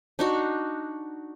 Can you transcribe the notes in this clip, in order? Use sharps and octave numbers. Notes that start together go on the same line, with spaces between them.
D4 D#4 F#4